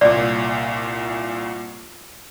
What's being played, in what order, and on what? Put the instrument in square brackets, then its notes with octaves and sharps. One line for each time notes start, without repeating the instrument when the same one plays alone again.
[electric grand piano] C2 A#2 [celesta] D5